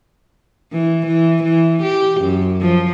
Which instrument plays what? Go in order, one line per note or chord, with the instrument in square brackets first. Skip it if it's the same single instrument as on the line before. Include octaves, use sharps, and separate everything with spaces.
[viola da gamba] E3
E3
E3
G4
F#2
F3